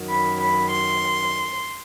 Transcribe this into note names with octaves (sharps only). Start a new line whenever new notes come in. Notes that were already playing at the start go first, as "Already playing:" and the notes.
Already playing: F#2 D#3 F#3
B5
B5
C6